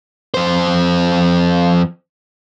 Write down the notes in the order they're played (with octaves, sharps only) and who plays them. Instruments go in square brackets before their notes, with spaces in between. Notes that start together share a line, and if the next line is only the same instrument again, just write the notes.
[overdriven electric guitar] F2 C5